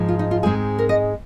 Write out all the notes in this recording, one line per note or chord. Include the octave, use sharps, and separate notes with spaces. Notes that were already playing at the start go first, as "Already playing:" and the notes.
Already playing: G#2 F3 G#3
F4
D#4
F4
G#2 G#3 C4 G#4
A#4
D#5